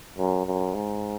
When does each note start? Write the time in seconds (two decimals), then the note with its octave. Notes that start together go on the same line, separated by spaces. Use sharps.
0.18 F#2
0.46 F#2
0.74 G#2